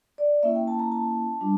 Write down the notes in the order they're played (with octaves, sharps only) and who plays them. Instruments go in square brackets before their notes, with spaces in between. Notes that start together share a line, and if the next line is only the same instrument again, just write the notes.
[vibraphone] D5
A#3 C#4 E4 E5
G5
A5
A#5
A5
G3 D4 F4